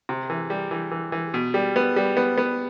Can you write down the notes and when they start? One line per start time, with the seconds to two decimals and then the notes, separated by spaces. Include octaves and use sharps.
0.09 C3
0.30 E3
0.50 G3
0.71 E3
0.91 E3
1.12 E3
1.34 B2
1.54 G3
1.76 B3
1.96 G3
2.17 B3
2.37 B3